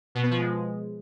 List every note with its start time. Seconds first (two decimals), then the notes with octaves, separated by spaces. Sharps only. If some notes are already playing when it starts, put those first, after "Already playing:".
0.15 B2
0.23 B3
0.31 F3
0.39 G#3